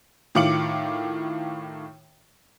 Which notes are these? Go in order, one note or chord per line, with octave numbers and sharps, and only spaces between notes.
A2 D#3 F4 D6 C#7 F#7